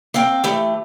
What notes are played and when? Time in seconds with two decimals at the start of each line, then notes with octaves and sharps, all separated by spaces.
0.14 A#3 C4 F5 G5
0.44 E3 A3 G4